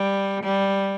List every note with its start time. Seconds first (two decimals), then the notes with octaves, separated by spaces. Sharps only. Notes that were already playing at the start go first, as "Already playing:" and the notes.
Already playing: G3
0.44 G3